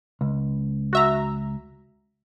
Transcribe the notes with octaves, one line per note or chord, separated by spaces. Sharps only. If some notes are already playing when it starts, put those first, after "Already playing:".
C#2
F#4 E5 A#5